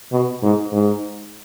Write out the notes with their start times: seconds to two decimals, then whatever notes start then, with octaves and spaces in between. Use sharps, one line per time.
0.12 B2
0.43 G#2
0.72 G#2